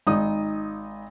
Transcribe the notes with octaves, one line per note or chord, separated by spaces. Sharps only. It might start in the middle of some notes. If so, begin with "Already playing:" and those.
G#1 D#4 D#6